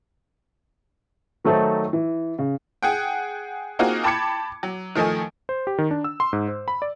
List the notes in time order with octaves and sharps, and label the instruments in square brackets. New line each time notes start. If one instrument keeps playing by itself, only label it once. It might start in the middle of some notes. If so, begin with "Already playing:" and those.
[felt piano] D#3 F#3 A3 D#4 A4 C5
E3
C#3
[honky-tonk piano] G#4 F#5 G5
A#3 C4 D#4 F4 F#4 G#4
G5 A5 B5 D6 G#6 C#7
F#3
D#3 F3 A3 D#5 G#5
[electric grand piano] C5
G4
D#3
D4
E6
C6
G#2
C5
B5
D5